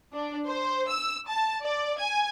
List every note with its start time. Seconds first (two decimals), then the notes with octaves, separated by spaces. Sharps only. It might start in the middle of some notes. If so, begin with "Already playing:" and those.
0.13 D4
0.47 C5
0.88 E6
1.28 A5
1.64 D5
1.98 G#5